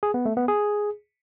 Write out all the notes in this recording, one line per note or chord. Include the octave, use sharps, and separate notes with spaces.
G#4
B3
A3
B3
G#4